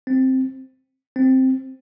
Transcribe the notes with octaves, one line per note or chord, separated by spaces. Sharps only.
C4
C4